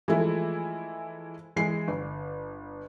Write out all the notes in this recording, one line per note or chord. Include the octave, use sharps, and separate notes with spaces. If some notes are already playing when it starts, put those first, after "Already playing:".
E3 F3 G#3 A3 E4
E3 G#3 C7
G1